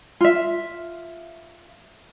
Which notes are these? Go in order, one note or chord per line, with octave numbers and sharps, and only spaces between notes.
F4 E5